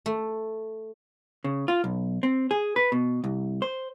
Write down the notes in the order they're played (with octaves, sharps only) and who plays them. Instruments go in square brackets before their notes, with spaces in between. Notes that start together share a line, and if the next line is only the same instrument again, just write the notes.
[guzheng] A3
[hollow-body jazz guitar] C#3
F4
B1
C4
G#4
B4
B2
C2
C5